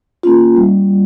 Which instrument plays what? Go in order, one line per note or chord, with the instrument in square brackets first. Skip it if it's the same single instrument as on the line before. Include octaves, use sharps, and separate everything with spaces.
[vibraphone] A#3 C#4 F4
G3